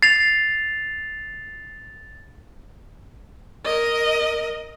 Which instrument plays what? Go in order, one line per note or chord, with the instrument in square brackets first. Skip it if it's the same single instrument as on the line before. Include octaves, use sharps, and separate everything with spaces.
[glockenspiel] A6 F7 [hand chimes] C7
[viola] A#4 D#5